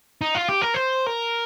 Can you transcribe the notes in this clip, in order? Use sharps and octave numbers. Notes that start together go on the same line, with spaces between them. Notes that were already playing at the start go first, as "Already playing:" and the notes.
D#4
F4
G4
A#4
C5
A#4